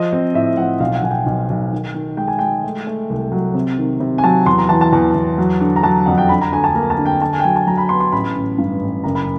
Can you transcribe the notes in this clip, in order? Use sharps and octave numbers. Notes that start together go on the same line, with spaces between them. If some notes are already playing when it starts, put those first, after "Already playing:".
Already playing: F3 D#5
C4
A2 E5
F3 F#5
B1 F5
F#5
B1 G#5
G5
B1
B1
D#3
D#3
G#3 G5
G#5
G#3 G5
A3
A3
C2
F#3
C3
D#3
C3
G#5
F#3 A5
E2 C6
A#5
E3 A5
A5
E2 A5
E2
F#3
D3
A#5
F#3 A5
F2 F#5
G5
D3 B5
A#5
D2 G#5
A5
A#3 A#5
A5
D3
G5
D3 A5
G#5
G5
F#3 G#5
A5
F#3 A#5
B5
B3 C6
C6
A1 B5
A1
G2
A1
F#1 A#5
B5